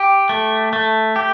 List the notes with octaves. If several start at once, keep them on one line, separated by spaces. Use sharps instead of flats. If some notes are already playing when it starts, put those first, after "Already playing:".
Already playing: G4
A3
A3
G4